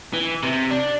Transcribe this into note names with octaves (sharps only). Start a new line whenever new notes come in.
E3
C3
D4